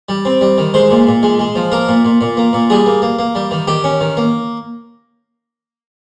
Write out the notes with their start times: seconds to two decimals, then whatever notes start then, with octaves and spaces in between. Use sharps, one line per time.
0.09 G3
0.25 C4
0.41 G3
0.58 D#3
0.74 G#3 C5
0.91 A#2
1.07 A#2
1.23 G#3
1.39 G#3
1.55 F3
1.72 A#3 A#4
1.88 A#2
2.05 A#2
2.21 A#2
2.37 A#3
2.53 A#2
2.70 G3 G#4
2.86 A#3
3.02 A#3
3.19 A#3
3.35 G3
3.51 D#3
3.67 D#3 G4
3.84 C#4
4.01 D#3
4.17 A#3